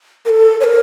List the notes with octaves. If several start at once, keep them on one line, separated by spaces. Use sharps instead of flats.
A#4
A4
C#5
A#4